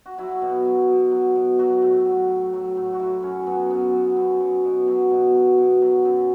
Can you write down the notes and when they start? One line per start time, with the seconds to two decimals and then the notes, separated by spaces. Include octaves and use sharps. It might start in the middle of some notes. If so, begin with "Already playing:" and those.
0.06 F#4
0.18 F#3 E4
0.42 B2
0.65 F#3
0.88 B2
1.12 F#3
1.36 B2
1.59 F#3 F#4
1.82 A2
2.06 F#3
2.30 A2
2.53 F#3
2.77 A2
2.93 F#4
2.99 F#3 E4
3.23 F#2 C#4
3.47 F#3 B3
3.70 F#2 B3
3.94 F#3
4.17 F#2
4.40 F#3
4.65 B2
4.88 F#3
5.11 B2
5.35 F#3
5.58 B2
5.82 F#3
6.05 F#2